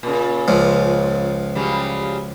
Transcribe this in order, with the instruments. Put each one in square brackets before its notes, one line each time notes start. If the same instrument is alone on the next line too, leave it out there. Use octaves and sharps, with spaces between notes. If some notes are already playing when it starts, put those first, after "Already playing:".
[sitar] A#2 C#3
[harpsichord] C#2 F3
[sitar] C#3 F#3 G3